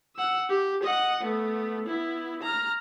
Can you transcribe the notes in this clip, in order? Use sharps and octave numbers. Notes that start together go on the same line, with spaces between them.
F#5 E6
G4
D#5 F#5
A3 B3
B3 E4
A#5 F6